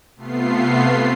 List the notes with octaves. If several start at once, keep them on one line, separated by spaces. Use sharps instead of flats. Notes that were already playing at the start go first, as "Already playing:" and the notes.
C3 A3 B3 F4 C7